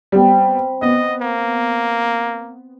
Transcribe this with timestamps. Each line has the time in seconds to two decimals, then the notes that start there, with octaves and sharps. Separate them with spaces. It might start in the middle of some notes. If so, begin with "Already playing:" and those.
0.12 G3 B3 C4 B5
0.82 B3 D#5
1.21 A#3